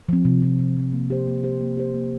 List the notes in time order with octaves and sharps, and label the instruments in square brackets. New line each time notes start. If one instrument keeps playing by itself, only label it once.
[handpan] F3 C4
C3
F3 C4
C3
F3 C4
A#3
G4 C5
A#3
G4 C5
A#3
G4 C5
A#3